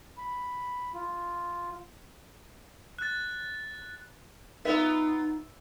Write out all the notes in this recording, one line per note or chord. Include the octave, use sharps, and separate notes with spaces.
B5
F4
F#6 A6
B3 D#4 F4 B4 E5